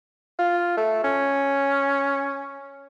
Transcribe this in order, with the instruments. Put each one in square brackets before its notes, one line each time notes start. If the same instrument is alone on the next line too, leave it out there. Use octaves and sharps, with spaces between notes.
[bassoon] F4
A3
C#4